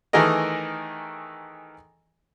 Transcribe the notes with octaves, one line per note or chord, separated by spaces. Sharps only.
D#3 E3 A3 G#4 A#4 D#5